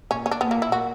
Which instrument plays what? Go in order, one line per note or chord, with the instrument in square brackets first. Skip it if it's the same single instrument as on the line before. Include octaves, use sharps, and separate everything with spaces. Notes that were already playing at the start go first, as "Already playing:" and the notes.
[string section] A#2 [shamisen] C#4
[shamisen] C#4
D4
[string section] A#2 [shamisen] B3
[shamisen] A#3
E4
F#4